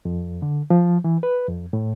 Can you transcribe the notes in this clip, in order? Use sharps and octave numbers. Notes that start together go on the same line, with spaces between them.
F2
D3
F3
E3
B4
F2
A2